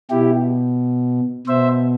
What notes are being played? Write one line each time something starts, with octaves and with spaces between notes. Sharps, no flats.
B2 E4 G4
B2 C5 E5